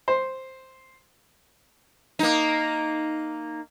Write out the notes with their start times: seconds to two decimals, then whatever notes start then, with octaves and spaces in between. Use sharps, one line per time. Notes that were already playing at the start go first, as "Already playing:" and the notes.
0.08 C5
2.19 A#3 D#4